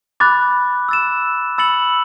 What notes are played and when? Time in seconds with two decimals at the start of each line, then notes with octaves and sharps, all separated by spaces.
0.20 B5 D6 F#6 A6
0.89 E6 A6 E7
1.58 B5 E6 A6 C#7 F#7